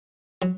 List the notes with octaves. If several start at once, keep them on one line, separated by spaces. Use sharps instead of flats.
F#3